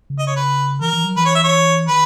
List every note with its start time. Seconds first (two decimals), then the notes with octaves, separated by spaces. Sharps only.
0.10 C#3
0.19 D#5
0.27 C#5
0.36 B4
0.81 E3 A#4
0.93 E3
1.04 F#3
1.16 E3 B4
1.25 C#5
1.35 E5
1.43 C#5
1.88 D#3 B4